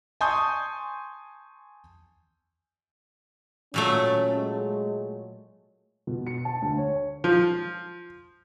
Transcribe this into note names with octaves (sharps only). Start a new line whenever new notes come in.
G#5 A5 C6 C#6 D#6 G6
A#2 F#3 A3 C#4
G#3
B2
C#7
A5
D2
C#5
F3